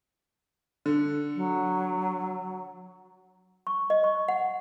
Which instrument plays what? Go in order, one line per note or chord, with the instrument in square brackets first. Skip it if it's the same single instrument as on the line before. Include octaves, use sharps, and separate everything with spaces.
[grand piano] D3
[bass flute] F#3
[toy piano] C#6
D#5
C#6
F#5